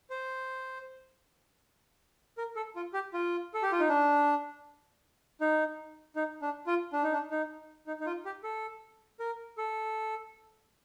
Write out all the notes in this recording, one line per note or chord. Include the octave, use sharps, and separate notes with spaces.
C5
A#4
A4
F4
G4
F4
A4
G4
F4
D#4
D4
D#4
D#4
D4
F4
D4
D#4
D4
D#4
D#4
D#4
F4
G4
A4
A#4
A4